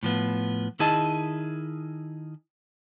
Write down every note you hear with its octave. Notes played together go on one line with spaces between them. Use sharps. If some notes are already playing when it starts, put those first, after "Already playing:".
A2 F3 B3
D#3 E4 G#4 D#5 A5